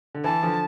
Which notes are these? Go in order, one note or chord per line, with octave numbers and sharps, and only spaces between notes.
D3
E3 A5
D3 F3